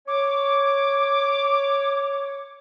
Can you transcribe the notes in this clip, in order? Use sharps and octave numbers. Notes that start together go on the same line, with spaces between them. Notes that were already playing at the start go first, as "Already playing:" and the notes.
C#5 D6